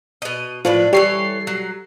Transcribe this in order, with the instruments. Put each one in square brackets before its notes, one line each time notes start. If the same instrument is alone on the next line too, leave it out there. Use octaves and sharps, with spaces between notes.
[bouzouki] B2 D#5
[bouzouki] A2 D4 B4 [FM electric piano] F3
[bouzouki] E3 A4 C#5 [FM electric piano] G3 C7
[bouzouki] F#3